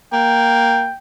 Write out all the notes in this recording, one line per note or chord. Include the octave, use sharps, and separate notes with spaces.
A#3 G5